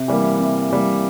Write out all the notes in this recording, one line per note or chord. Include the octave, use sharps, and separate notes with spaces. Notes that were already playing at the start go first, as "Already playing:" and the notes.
Already playing: C3
E3 G3 A#3
C3
E3 G3 A#3